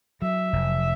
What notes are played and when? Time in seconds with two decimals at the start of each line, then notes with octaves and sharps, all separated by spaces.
0.22 F#3 E5
0.53 F1